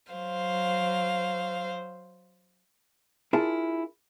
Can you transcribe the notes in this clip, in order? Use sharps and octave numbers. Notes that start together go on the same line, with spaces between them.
F#3 C5 F5
D4 E4 F4 G#4 A#4 A5